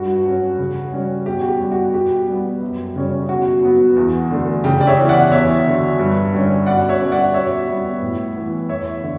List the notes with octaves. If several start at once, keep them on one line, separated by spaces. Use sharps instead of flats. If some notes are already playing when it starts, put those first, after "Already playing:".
Already playing: G2 F#4
F#3 C#4
C#3
G3 C#4
B2 G4
F#4
G4
G3 B3
F#4
B2 G4
G3 B3
F#2
C#3 G3 C#4
B2 F#4
F#3 B3
E2
D3 A3
C#3 G4
D5
C#5 E5
E3 B3
D5 F#5
E2 C#5 E5
D3 F#3
G2
D3 G3 C#4
B2 D5 F#5
C#5 E5
G3 C#4
D5 F#5
B2 C#5 E5
G3 B3
A2
E3 B3
E2 C#5 E5
D3